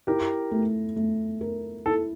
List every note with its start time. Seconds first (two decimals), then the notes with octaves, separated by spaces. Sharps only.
0.07 E4 G4 A#4
0.51 A3
0.96 A3
1.41 A#4
1.86 E4 A4